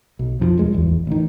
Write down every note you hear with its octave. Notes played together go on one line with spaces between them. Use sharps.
B1
F2 D#3 F3
D#1 G2 G#3
D1 G#1 E2
A1 D#3